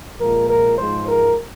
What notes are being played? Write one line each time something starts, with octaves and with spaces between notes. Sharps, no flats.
A#2 F3 G#3 A#4
A#4
G#2 F3 G#3 C5
A#4